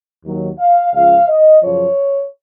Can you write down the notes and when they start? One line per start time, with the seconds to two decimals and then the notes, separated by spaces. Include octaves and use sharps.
0.25 D#2 D#3 F#3
0.59 F5
0.93 C#2 C#3 F3 F5
1.28 D#5
1.62 F#2 C#3 F3 C#5